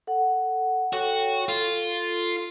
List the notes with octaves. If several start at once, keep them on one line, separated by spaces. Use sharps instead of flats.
A4 F#5
F#4 A4 C#5 G5
F4 A4